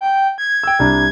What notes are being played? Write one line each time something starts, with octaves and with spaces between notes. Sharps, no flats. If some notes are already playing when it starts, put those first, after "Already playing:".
G5
G#6
G5 E6
C2 D4 A#5